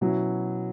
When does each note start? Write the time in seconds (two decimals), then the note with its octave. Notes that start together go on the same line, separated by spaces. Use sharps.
0.01 B2 F#3 C#4 E4